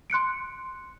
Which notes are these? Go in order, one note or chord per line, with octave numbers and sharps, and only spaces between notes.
C6 F#6 C#7 D7